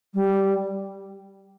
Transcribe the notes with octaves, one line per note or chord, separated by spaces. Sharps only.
G3